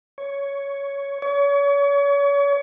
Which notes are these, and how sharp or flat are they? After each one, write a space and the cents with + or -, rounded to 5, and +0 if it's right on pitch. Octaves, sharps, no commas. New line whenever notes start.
C#5 +10
C#5 +35